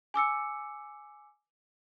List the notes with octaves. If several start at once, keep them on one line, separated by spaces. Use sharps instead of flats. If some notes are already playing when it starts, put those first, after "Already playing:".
G#5 D6 E6 C#7